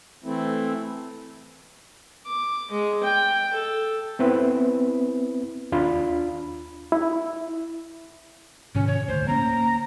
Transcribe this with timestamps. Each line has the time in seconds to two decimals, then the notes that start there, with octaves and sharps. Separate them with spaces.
0.24 E3 A3 C4 E4
2.26 D6
2.71 G#3
3.03 G5
3.53 A4
4.19 B3 C4 E4 B4
5.72 D#2 D4 F4 B5
6.92 E4
8.75 G#2 C3 D#3 C#4
8.87 C#5
9.08 D#1 D2 C5
9.28 A#3 C#4 A#5